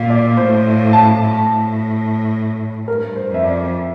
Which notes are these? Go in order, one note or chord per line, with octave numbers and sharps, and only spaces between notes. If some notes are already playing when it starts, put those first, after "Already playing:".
Already playing: A#2 F5
D5
A2 C5
A5
A2
G2 A#4
C5
F2 E5
D5